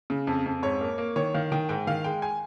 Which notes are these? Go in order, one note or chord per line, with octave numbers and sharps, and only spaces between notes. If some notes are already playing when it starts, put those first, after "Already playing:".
C#3
F2
F2
G#2 C#5
A#3
A#3
D#3 C#5
D#3 F5
D#3 G5
G#2 G5
D#3 F5
G#3 G5
G#5